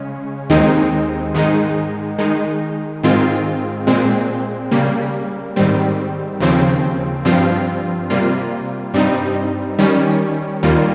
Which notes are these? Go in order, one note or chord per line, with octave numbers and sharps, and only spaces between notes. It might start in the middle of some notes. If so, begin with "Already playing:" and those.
Already playing: C#3 G#3 C#4
D#2 D#3 G#3 C4 D#4
G#2 D#3 G#3 D#4
D#3 G#3 D#4
G#2 D#3 G#3 C4 F4
A#2 G#3 C4
C#3 G3 A#3
G#2 D#3 G3 C4
D#2 C#3 F3 C4
G2 F3 C4 F4
C3 G3 A#3 F4
G2 G3 C4 D#4
D#3 G3 C#4
D#2 D#3 G3 A#3 F4